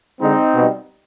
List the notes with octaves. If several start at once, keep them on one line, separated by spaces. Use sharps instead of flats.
D3 G#3 C4 D#4
B2 G3